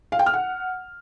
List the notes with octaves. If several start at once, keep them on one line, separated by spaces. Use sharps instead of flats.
F5
G5
F6
F#5